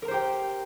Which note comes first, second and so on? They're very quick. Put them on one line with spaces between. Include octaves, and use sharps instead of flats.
A#4 A#5 C5 G4 G5